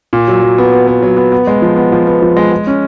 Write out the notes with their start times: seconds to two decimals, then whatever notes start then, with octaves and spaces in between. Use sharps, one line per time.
0.13 A#2
0.28 F#3
0.42 F#3
0.58 B3
0.72 B3
0.87 B3
1.02 F#3
1.17 B3
1.32 B3
1.47 G#3
1.62 F3
1.77 B3
1.92 F3
2.07 B3
2.22 F3
2.37 G#3
2.52 G#3
2.67 C#4